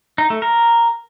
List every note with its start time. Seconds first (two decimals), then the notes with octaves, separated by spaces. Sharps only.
0.18 D#4
0.30 A3
0.42 A#4